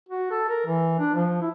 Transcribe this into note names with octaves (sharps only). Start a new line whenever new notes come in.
F#4
A4
A#4
E3
D4
F3
E4